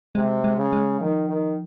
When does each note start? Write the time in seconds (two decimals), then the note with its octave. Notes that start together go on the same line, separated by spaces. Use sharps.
0.15 C3 G#3
0.44 G#3
0.57 C#3
0.73 G#3
1.00 D#3 F3
1.29 D#3